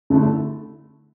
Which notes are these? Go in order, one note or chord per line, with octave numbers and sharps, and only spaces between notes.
D3 A3 E4 A4